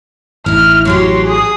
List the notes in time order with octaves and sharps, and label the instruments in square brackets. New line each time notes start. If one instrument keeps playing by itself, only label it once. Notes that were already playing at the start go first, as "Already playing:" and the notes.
[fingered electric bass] A1 [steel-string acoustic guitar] D#4 E4 [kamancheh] F6
[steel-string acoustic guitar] F#3 F#4 G4 [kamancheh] C#5 C6
[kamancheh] G#4 D#6